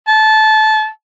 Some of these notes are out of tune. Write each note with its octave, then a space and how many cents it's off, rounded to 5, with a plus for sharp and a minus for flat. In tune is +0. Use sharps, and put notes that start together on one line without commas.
A5 -20